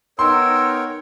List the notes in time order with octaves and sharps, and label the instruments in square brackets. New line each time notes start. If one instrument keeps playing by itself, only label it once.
[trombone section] B3 D#4 [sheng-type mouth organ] A#4 C#5 G5 [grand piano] C6 [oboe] E6